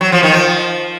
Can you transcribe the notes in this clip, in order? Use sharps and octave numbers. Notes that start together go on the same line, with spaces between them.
F#3
F3
D#3
F3